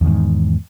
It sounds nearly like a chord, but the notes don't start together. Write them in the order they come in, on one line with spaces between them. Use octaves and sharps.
E2 D#3 G#2